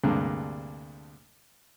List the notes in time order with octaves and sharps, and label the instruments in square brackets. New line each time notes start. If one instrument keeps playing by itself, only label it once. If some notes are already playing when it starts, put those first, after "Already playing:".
[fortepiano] D2 G2 C3 G#3 A#3 D4